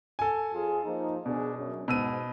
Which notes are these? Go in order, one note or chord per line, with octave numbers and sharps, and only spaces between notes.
A4 G#5
F2 F4 G#4
F3 A#3 D#4
B2 D4 G#4
F#2
G#2 B2 E6 D#7